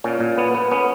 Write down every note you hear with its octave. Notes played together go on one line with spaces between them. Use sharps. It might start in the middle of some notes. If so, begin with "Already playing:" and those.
A#2 C#4
A#2
B3
B3
B3 C#4